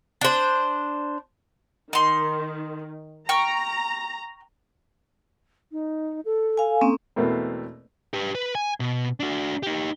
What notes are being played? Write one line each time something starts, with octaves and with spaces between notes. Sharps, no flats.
D4 C5
D#3 D#4 C6
G5 A#5 C#6 F6
D#4
A4
F5 G#5
A#3 C4 C#4
E2 B2 A3 A#3 C4
G4 B4
B4
G#5
B2
D4 F#4
D#4 G4